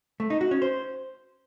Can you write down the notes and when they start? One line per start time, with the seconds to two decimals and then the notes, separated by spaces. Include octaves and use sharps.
0.20 A3
0.30 D#4
0.41 F#4
0.51 C#4
0.62 C5